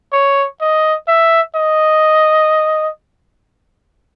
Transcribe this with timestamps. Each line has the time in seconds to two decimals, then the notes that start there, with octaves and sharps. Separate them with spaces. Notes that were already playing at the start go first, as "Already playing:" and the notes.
0.13 C#5
0.61 D#5
1.08 E5
1.56 D#5